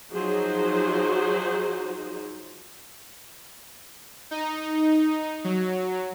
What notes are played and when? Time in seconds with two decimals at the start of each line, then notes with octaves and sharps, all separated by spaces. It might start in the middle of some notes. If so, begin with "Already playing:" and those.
0.12 F3 F#3 D#4 F#4 G#4 C5
4.31 D#4
5.44 F#3